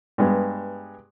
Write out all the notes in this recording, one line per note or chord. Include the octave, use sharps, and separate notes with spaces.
G2 G#3 B3